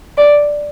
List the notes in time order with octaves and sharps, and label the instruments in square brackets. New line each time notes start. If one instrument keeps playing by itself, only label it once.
[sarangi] D5